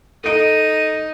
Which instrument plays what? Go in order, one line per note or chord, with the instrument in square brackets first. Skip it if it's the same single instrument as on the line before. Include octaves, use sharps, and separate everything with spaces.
[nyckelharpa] D#4 [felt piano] A4 D7 [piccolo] D#7